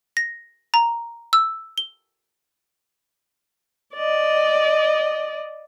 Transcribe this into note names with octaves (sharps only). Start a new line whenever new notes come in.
A#6
A#5
E6
G7
D5 D#5